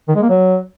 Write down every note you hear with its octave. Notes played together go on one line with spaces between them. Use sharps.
D#3
G#3
A#3
F#3